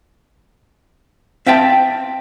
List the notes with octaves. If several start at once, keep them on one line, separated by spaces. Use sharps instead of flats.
C4 E5 F5 G5 A5